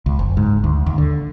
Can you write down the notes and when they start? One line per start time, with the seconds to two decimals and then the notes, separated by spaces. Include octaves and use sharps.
0.06 C#2
0.19 F#1
0.37 G#2
0.64 D2
0.86 D#2
0.98 D3